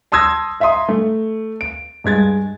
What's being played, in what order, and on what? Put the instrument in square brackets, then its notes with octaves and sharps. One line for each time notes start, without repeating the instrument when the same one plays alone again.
[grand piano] A5 C6 D#6 E6 G#6 A#6
D#5 E5 A#5 C6 D#6
A3
D7
G2 G#3 G#6 A6